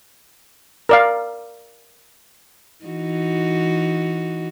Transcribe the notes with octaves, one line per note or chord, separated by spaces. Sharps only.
A#4 D5 F5
E3 D#4 F#4